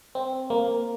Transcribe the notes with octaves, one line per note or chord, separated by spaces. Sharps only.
C4
A#3